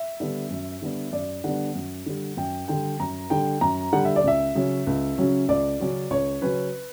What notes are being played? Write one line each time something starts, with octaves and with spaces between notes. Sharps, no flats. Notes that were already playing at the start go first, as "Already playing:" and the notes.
Already playing: E5
D3 G3 B3 D4
F#2
D3 G3 B3 D4
F#2 D5
D3 G3 B3 D4 F#5
F#2
D3 G3
F#2 G5
D3 G3 G5
F#2 A#5
D3 G3 G5
F#2 A#5
D3 G3 F#5
E5
D5
C#2 E5
C#3 F#3 C#4
C#2
C#3 F#3 C#4
C#2 D5
C#3 F#3 C#4
C#2 C#5
C#3 F#3 C#4 B4